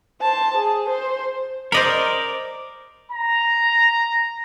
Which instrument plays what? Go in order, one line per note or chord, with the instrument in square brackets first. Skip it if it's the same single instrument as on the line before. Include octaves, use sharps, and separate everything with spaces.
[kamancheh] C5 A5
G#4
C5
[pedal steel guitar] A#4 D5 [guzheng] C5 D#5 B5
[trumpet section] A#5